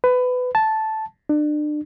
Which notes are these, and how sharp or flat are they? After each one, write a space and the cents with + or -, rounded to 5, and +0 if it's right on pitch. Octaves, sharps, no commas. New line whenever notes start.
B4 +20
A5 -5
D4 +35